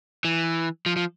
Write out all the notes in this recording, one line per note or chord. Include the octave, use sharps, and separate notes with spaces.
E3
F3
F3